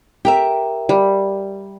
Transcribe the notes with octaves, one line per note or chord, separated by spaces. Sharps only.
G4 A#4 E5 G5
G3